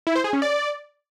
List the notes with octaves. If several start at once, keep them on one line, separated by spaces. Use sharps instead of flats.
E4
C5
G#4
C#4
D5